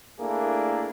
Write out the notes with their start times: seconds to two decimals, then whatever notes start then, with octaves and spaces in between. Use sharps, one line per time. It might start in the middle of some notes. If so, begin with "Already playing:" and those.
0.19 A3 A#3 D4 E4 G#4